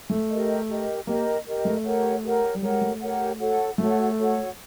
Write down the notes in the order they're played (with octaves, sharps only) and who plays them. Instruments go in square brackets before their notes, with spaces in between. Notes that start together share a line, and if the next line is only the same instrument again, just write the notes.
[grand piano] A3
[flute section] G4 A#4 D#5
G4 A#4 D#5
[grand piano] A#3 [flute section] G4 A#4 D#5
[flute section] G4 A#4 D#5
[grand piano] A3
[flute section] G4 A#4 C#5 F#5
G4 A#4 C#5 F#5
[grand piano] G3
[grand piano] G#3 [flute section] G4 A#4 C#5 F#5
[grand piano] A3
[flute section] G4 A#4 C#5 F#5
F#4 A4 C#5 F#5
[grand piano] A3 [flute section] F#4 A4 C#5 F#5
[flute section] F#4 A4 C#5 F#5